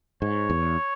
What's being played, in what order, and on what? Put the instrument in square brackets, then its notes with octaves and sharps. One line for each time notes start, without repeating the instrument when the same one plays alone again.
[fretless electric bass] G#2 [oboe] C#5
[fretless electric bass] E2